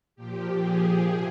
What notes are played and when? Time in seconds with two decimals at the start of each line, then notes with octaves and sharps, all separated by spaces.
0.16 A#2 F3 G4
0.57 G#4
0.99 C3 G#4